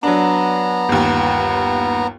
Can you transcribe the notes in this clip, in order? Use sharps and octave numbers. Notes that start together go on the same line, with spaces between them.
F#3 B3 D4 A#5
G1 D#2